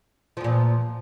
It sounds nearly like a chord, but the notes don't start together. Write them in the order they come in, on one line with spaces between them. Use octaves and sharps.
F3 E2 A#2